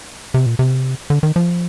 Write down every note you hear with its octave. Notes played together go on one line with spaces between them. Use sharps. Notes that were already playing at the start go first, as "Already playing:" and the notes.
C3
A#2
C3
D3
D#3
F3